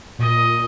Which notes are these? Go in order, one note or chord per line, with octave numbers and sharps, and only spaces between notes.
A#2 D#5